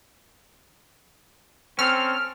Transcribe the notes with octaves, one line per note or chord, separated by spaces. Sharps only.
C4 C#4 A4 F6